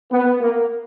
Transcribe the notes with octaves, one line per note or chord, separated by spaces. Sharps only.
B3
A#3